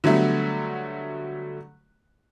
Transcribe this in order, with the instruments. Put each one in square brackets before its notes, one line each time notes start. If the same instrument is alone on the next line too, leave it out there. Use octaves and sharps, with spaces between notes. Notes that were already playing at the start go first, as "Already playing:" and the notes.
[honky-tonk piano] D3 F#3 G3 A3 B3